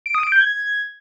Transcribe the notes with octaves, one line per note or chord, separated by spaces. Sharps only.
D7
D#6
D7
G6
G#6